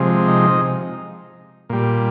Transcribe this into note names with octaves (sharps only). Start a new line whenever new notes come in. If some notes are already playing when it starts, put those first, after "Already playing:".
Already playing: C3 F3 G#3
D#4
A#2 G3